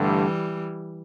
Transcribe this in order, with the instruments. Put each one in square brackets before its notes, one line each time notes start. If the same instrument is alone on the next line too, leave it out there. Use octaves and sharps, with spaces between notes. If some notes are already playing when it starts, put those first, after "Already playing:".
Already playing: [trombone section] G2 D3 A3 [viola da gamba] E3 G3